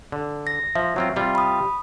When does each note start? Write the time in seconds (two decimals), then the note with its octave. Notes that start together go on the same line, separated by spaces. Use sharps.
0.12 D3
0.47 A#6
0.75 F3 E5
0.96 F#3 C4 F4
1.16 C3 G3 F4
1.35 B5 D#6